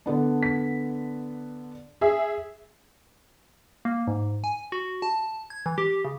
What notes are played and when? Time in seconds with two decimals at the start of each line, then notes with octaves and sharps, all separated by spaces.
0.06 D3 B3 D4
0.43 B6
2.01 G#4 E5
3.85 A#3
4.07 G#2
4.44 G#5
4.72 F#4
5.02 A5
5.50 G#6
5.66 E3
5.78 G4
6.05 C#3